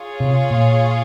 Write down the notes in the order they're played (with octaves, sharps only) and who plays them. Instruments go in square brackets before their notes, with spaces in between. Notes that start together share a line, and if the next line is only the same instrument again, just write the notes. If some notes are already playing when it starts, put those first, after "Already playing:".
Already playing: [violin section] F4 G#4 C#5
[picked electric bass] C3
A#2